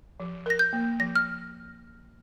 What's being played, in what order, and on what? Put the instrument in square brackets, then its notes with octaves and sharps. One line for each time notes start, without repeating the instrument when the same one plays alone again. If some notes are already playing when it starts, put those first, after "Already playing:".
[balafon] F3
[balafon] A#4 [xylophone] A#6
[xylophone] G6
[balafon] A#3
[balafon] F3 [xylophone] A#6
[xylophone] F6